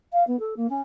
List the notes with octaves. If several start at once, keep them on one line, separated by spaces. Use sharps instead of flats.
F5
B3
A4
A#3
C#4